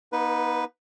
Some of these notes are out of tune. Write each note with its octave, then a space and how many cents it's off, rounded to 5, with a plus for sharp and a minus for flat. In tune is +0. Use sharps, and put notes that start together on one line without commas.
B3 -40 D#4 +15 B4 +0